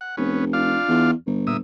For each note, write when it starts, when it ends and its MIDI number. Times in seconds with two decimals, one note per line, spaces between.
0.01 0.16 78
0.17 0.76 29
0.17 0.45 59
0.17 0.45 61
0.53 1.11 62
0.53 1.11 65
0.53 1.11 77
0.89 1.13 40
1.26 1.61 31
1.47 1.57 46
1.47 1.57 76
1.47 1.57 87